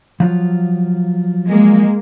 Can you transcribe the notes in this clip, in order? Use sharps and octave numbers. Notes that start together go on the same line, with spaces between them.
F3 F#3 F4
G#3 A#3